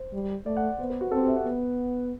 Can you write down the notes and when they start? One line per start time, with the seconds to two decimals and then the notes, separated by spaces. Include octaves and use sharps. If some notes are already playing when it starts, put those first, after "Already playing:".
Already playing: C5
0.13 G3
0.46 A3 D5
0.57 F#5
0.79 B3 C5
0.90 B4
1.01 F#4
1.11 C4 A4
1.20 G4
1.28 E5
1.36 F#5
1.45 B3